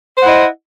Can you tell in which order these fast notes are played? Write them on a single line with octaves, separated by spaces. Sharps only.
C5 F#5 E4 D#5